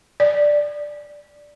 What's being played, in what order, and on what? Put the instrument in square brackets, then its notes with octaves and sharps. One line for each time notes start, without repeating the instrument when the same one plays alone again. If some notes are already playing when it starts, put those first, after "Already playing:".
[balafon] D5